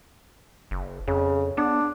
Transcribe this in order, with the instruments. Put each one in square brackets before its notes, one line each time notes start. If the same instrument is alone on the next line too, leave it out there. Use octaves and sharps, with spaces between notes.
[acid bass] F#1
[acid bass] F2 [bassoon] C#3
[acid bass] B3 [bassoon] D4